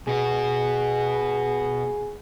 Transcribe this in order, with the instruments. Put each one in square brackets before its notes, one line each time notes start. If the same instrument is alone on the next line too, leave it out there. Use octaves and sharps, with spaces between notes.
[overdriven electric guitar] B2 B3 [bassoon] G#4